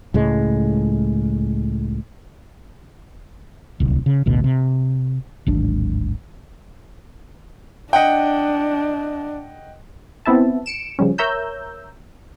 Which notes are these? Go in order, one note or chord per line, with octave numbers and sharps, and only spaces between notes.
C#2 A2 G#3
D1 C2
C#3
A1 D2 B2
C3
D1 G#1 D4
D4 D#5 F#5 G5
B3 C4 E4 E5 A5
C#7 D7 E7
C#3 F3 G3 C#4
A#4 C#5 E5 A#5 E6 G6